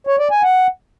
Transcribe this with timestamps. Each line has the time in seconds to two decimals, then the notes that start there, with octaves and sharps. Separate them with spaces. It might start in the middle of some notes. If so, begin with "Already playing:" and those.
0.07 C#5
0.19 D5
0.31 G#5
0.43 F#5